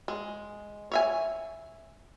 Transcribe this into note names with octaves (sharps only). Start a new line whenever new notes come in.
G#3
C#5 E5 G#5